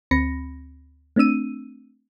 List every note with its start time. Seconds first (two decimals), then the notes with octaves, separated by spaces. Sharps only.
0.11 D2 C4 B5 A#6 C#7
1.16 A3 C4 D4 E6 D#7